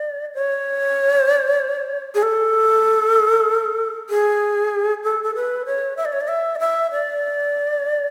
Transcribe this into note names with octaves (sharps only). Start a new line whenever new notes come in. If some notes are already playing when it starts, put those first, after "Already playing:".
Already playing: D5
C#5
G#4
A4
G#4
A4
A4
B4
C#5
E5
D5
C#5
D5
E5
D5
E5
D5